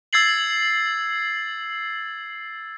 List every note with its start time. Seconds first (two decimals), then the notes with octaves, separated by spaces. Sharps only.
0.13 E6 G#6 A6 C7 F#7